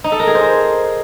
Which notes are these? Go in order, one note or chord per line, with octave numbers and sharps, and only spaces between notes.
D#4
A4
A#4
G#4
C5